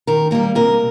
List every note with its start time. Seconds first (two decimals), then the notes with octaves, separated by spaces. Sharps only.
0.07 D#3 A#4
0.31 G3 A#3 A#4
0.55 C3 A#4